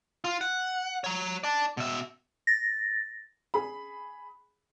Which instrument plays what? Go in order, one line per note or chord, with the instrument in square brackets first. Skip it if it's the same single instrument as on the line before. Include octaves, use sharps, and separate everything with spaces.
[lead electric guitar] F4
F#5
C#5 A#5
D5 A5
B2 E5
[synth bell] A6 A#6
[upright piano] G#4 B5